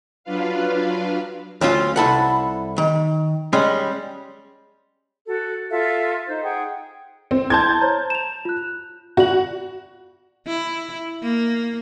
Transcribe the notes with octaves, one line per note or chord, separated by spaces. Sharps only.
F#3 D4 F4 B4 F5
D2 F#3 C#4 F4
C2 E4 A4 F#5
D#3
G3 G#3 C#4
F#4 A4
F4 A4 E5 F5
D#4 C5
G#4 F#5 G5
C4
E4 A5 C6 G6 G#6
C5 C#5 A#5
E7 F7
F4 F#6
F4 F#4 D5 F#7
E4
A#3